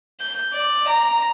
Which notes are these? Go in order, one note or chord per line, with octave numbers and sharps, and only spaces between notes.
G6
D5
A#5